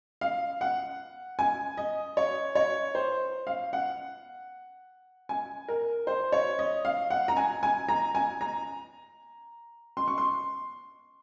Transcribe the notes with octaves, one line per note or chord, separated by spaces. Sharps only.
F5
F#5
G#5
D#5
C#5
C#5
C5
F5
F#5
G#5
A#4
C5
C#5
D#5
F5
F#5
A#5
G#5
G#5
A#5
G#5
A#5
C6
C#6
C6